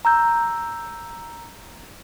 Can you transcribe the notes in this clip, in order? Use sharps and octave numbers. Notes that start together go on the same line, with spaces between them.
A#5 E6 G6